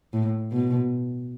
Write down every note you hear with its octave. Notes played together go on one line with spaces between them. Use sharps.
A2
B2